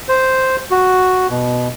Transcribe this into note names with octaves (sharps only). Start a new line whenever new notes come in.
C5
F#4
B2